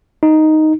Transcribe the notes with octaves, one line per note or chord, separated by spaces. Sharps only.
D#4